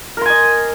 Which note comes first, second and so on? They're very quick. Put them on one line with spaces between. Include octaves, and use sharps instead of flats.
A#4 C6 G#5 D#5